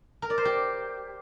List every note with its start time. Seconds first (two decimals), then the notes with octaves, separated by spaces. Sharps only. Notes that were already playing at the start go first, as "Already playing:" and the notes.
0.22 A#4
0.30 D5
0.38 C5
0.45 G4